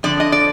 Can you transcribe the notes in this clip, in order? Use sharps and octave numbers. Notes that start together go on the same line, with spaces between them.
F2 D3 F3 D4 D5
D#5
D5